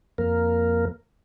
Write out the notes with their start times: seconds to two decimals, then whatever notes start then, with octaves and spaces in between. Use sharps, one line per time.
0.18 F2 A#3 A#4